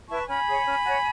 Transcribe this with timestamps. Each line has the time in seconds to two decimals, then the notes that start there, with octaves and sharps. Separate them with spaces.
0.09 E4 B4 A5 C#6
0.28 C#4 G#5 B5
0.47 G#4 C#5
0.66 C#4
0.86 F#4 C#5